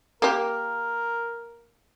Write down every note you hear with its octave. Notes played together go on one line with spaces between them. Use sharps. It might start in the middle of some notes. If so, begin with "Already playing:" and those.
A#3 G4 A#4